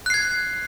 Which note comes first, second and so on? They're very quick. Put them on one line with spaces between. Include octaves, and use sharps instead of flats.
F#6 C7 G#6